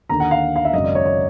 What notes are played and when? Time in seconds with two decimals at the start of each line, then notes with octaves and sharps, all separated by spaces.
0.09 D#2 D3 A#5
0.20 F#5
0.31 F5
0.56 F5
0.65 E5
0.73 G#1 F#2 C#3 D#5
0.84 D5
0.95 C#5
1.06 C#5